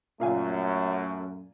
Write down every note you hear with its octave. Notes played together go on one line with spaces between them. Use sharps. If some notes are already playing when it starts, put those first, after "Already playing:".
F#2 A#2 A3 F5 G#5